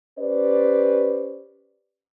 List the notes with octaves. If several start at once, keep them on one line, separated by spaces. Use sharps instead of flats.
C#4 G4 B4 C5 D5